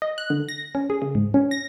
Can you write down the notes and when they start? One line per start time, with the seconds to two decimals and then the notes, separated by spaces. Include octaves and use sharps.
0.02 D#5
0.18 F#6
0.30 D3
0.49 A#6
0.75 C#4
0.90 G#4
1.02 C#3
1.15 G#2
1.34 C#4
1.51 A#6